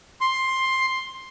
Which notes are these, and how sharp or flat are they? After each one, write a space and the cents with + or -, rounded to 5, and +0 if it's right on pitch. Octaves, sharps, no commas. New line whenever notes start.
C6 +10